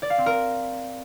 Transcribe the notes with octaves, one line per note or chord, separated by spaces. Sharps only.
D5
F5
C4
A#4